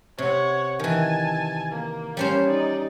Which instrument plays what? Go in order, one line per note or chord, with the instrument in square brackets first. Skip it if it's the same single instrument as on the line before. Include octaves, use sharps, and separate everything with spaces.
[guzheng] C3 [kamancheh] C#5 F#5
[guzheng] D#3 E3 [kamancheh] G#5 A5
[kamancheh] A#3
[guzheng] G3 C#4 C5
[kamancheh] D#4 D5